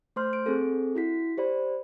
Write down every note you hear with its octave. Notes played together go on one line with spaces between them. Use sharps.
A3 C5 C6 F6 G6
D7
C4 G#4 A4
E4 F#4 B6
G4 C5 D5 B5